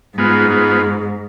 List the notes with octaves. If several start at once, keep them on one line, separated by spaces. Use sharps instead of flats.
G#2 G#3 B3 F4
G#3 B3 F4